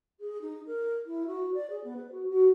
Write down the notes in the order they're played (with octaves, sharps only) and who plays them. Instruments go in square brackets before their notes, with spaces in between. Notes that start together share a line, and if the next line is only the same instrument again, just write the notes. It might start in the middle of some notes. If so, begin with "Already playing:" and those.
[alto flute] G#4
D#4
A#4
E4
F#4
D5
G#4
B3
B4
F#4
F#4